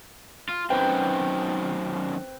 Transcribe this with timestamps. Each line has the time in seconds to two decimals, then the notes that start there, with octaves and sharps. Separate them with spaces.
0.49 F4
0.70 F#2 D#3 C4 B4 G5